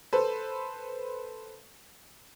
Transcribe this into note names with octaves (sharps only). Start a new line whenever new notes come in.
A4 B4 C5